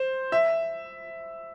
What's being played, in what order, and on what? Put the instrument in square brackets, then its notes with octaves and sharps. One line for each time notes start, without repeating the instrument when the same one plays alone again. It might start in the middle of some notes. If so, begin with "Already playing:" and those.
Already playing: [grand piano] C5
E5